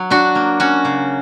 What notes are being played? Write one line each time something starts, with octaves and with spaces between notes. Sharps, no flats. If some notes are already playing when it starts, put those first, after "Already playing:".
Already playing: F#3
D4 F#4
A#3
C#4 F#4
C#3